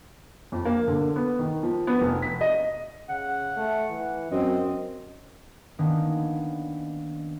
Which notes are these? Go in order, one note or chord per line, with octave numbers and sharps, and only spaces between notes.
F2
A#3
D3
B3
D#3
F3
B3
F1
B6
D#5
C#3 F#5
A3
E3
F#2 C4 D#5
D#3 A#3 B3 C#4 D4